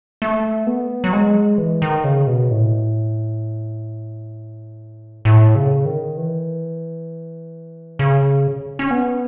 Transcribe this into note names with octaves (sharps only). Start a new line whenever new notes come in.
A3
B3
F#3
G#3
E3
D#3
C#3
B2
A2
A2
C#3
D#3
E3
C#3
C#4
B3